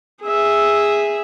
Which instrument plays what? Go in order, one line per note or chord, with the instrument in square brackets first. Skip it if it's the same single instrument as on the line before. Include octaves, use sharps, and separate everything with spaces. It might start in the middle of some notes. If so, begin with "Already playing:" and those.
[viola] G#4 E5